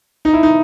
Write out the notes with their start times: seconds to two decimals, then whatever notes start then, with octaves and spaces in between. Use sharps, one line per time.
0.25 D#4
0.33 E4
0.43 D#4